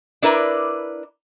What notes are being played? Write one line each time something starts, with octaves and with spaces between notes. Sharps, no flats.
D4 E4 A#4 B4 D5